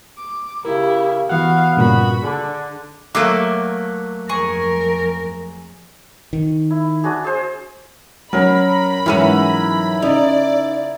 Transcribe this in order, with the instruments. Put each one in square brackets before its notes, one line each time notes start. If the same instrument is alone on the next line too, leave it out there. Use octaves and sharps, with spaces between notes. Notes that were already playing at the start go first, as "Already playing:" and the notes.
[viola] D6
[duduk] C#3 [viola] E4 G4 [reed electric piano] A#4
[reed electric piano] E3 F#5 [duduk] B3 [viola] F#4 F5
[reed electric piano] G2 A#2 C#3 [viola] F#4 B5
[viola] D3 [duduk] D4 [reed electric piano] G#4
[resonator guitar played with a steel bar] F#3 A3 A#3 [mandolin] D6
[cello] F2 A#4 [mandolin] G#4 C#6
[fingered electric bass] D#3
[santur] E4
D4 F#4 G#4
G#4 C5
[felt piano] F#3 C#4 [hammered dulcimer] A#4 [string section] B5
[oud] G#2 F#3 C#4 [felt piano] E3 F6 D#7 [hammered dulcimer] E4
[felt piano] C#3 [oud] D#4 [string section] D5